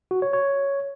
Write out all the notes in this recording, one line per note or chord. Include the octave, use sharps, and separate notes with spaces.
F#4
C#5
C#5